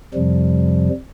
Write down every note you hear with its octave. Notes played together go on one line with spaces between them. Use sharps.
F2 C3 F3 G3